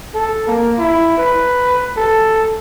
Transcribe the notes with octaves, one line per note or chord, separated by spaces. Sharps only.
A4
A#3
E4
B4
A4